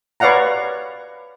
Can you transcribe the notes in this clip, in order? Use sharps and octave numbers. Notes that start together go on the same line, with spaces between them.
B4 C#5 D5 F5 F#5 A#5